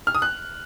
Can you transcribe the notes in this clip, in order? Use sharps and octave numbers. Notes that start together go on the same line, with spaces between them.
F6
D#6
F#6